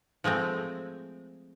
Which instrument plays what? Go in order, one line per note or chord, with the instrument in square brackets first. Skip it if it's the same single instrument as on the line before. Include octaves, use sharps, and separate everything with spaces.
[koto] F3 G#3 A3 C4